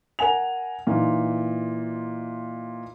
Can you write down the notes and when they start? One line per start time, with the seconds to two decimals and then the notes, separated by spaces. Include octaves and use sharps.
0.19 A#4 F#5 G#5 F7
0.87 A#2 E3 D#4 F4